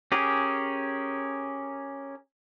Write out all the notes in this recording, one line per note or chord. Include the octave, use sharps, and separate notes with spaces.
C#4 G4 G#4 A#4